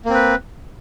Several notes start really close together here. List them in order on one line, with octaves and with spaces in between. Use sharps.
A#3 C4 B4